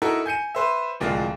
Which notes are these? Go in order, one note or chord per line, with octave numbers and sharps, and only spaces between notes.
D#4 E4 F#4 A4 A#4
G#5 G6 C#7 D#7
B4 C5 E5
D1 C2 F3 G#3 F4 F5